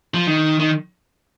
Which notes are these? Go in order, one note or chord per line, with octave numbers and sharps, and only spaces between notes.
F3
D#3
D#3